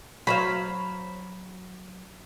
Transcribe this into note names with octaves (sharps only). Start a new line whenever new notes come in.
F#3 C5 F5 B5